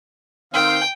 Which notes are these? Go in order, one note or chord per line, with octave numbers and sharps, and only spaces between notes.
D#3 C4 F5 G5